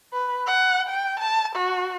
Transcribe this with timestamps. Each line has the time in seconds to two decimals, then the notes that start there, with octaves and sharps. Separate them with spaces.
0.13 B4
0.47 F#5
0.88 G5
1.19 A5
1.55 F#4